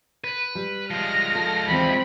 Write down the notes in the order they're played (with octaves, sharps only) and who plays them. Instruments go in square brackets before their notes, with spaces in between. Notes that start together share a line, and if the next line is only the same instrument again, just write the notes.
[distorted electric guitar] B4
[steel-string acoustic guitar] G3
[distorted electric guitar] F3 G#3 [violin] F6 A#6
[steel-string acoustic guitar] A4
[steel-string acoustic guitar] D#2 E3 D5 [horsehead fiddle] C4 B5